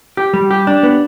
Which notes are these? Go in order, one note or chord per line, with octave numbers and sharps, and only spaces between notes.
G4
G3
G4
D4
B3